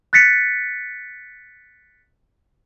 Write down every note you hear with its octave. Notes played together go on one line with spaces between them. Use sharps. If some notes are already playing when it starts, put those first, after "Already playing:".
F#6 A6 B6 C#7